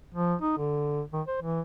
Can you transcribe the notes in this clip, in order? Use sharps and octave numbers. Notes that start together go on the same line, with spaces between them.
F3
D#4
D3
D#3
C5
E3